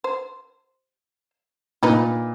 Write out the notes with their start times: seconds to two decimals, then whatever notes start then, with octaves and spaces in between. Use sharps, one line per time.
0.04 C5
1.83 A#2 D4 D#4 B4